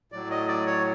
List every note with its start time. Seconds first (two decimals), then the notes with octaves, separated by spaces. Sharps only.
0.12 A2 F#3 D5
0.30 D#5
0.48 D5
0.67 C#5